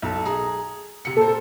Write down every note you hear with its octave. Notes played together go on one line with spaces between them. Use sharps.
B1 A4
G#4 A#5
C3 C#7
A#2 A4 C5